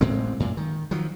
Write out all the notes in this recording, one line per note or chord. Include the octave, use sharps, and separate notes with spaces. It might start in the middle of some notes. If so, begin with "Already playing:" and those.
A1 A2 G#3 C4
F#2 A#2
D#3
D#3 F3 F#3